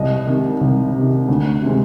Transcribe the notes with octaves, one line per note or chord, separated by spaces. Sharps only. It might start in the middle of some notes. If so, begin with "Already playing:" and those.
Already playing: C2 D#5
C3 D#3
C2
C3
D#3
D2
C3 D#3 G#3 C4